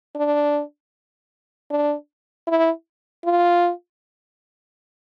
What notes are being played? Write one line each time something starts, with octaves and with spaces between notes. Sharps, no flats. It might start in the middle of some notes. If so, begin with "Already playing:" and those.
D4
D4
E4
F4